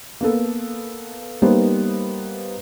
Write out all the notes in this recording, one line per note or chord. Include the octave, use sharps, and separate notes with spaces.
A#3 B3 A4
G3 A#3 B3 D#4 C5